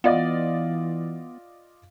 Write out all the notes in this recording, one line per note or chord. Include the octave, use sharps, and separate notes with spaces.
E3 B3 F4 D5 D#5